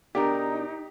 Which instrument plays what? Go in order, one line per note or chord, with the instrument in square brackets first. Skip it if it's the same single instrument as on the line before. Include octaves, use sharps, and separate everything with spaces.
[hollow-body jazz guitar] B2 D4 A#4 [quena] D#4 [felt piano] G4